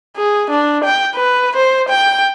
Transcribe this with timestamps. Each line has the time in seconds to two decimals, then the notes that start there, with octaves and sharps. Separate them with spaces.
0.17 G#4
0.50 D4
0.84 G5
1.16 B4
1.56 C5
1.89 G5